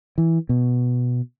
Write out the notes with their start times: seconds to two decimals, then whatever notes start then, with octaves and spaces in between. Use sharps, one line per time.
0.18 E3
0.49 B2